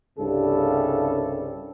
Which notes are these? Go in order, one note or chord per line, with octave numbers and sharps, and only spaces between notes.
C2 G2 C#3 G3 A4